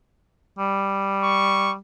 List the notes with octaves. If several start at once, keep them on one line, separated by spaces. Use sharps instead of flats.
G3
C#6